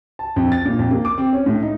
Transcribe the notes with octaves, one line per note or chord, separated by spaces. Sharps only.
A5
F2
A6
A#2
F2
A#3
D6
C4
C#4
A2
D#4